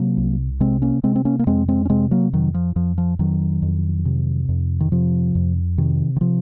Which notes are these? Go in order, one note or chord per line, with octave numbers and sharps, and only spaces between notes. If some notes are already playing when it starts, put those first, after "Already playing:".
Already playing: C3 F#3 A#3
C2
C3 G#3 C4
A#3 C#4
C3 G#3 C4
C4
A#3 C#4
A#3
F2 G#3 C4
G#3 C4
C#4
C3 G#3 C4
F#3 A#3
F2 D#3 F#3
F3
F2 F3
F3
F2 D#3 F#3
F2
C3
F2
D#3
C3 F3
F2
C3 D#3
D#3
C3 F3